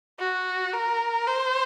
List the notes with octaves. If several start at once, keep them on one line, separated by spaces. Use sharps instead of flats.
F#4
A#4
C5